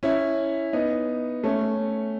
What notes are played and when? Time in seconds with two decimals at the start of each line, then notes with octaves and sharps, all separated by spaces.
0.03 C#4 E4
0.73 B3 D#4
1.44 A3 C#4